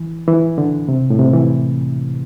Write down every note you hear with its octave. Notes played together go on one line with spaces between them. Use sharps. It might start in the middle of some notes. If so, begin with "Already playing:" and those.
Already playing: E3
E3
D3
C3
A2
C3
E3